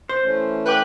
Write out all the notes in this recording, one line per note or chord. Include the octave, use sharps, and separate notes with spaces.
C5
E3 A3 C#4
B4 G5 D6 F#6